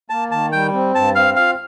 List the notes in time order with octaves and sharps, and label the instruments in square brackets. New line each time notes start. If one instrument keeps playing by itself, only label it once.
[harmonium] A#3 [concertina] A5
[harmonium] D#3 [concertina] A5
[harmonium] G3 [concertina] G5
[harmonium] C4
[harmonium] G2 [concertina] A5
[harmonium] C4 [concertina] F5
[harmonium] F4 [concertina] F5